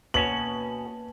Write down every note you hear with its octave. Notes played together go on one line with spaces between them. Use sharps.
B2 A#3 C#4 F#4 B4 A5 F#7